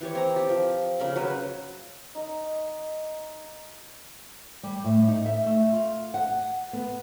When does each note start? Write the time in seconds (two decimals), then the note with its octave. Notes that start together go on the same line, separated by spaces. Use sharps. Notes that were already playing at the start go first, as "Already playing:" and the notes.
0.01 E3 G4 C#5
0.15 C4 A#5
0.36 G4
0.49 F3
1.00 C#3 A#4 B5
1.16 F#3 B4
2.15 D#4 D#5
4.63 G3
4.84 A2
5.08 D#4
5.26 E5
5.46 A3
5.72 F4
6.14 F#5
6.73 B3